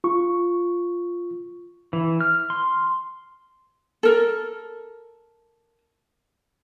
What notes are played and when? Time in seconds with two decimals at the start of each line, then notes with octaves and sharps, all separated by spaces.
0.04 F4 C#6
1.93 E3
2.21 F6
2.50 C6
4.03 A4 A#4